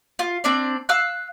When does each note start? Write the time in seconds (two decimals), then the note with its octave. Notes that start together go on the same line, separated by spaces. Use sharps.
0.19 F4
0.44 C4 D4 D5
0.89 F5 E6 F#6